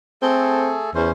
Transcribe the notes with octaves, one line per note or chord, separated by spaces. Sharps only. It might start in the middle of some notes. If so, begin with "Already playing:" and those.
A3 C4 G#4 A4
E2 C#4 C5